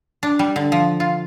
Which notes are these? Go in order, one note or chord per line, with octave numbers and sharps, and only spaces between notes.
D4
G3
D3
F3
F4